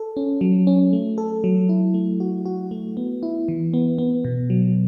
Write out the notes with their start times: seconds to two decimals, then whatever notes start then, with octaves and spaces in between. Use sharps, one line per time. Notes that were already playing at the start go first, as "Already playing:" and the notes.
Already playing: A4
0.17 C#4
0.41 F#3
0.67 C#4
0.93 A3
1.18 A4
1.44 F#3
1.69 E4
1.94 A3
2.20 F#4
2.46 F#4
2.71 A3
2.97 B3
3.23 E4
3.48 E3
3.74 B3
3.98 B3
4.25 B2
4.50 F#3